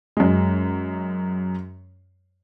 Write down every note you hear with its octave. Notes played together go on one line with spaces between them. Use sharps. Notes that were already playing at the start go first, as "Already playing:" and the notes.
F#2 G#3